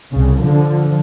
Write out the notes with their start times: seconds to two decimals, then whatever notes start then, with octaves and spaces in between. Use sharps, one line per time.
0.14 C2 C#3
0.42 D3 F3